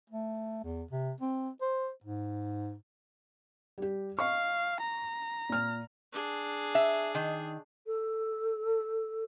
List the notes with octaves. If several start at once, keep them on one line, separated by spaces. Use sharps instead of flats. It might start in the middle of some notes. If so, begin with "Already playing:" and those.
A3
E2
C3
C4
C5
G#2
G3 G4
D#5 F5 C#6
A#5
A#2 F6
D4 G#4
E5
D#3
A4